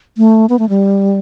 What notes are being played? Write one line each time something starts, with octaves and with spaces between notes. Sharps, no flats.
A3
B3
A3
G3